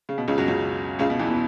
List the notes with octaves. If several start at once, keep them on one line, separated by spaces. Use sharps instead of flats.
C#3
B2
C#2 C#3
F#2 F#3
C#2 C#3
C#2 C#3
B2
E2 E3
B2